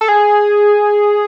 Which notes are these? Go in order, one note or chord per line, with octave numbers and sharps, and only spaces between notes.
A4
G#4